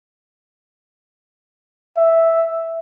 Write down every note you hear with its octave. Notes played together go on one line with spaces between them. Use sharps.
E5